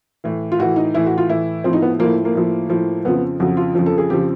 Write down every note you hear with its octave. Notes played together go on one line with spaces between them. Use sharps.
A2 E3
F4
A2 E3 F#4
D#4
A2 E3 E4
F#4
F4
A2 E3 E4
A2 F3 C4
D#4
B3
A2 F3 A#3
A#3
A2 F3
A2 F3
F2 C#3 F3 B3
F2 C#3 F3 F#4
F4
F2 C#3 F3
A4
G#4
F2 C#3 F3 G4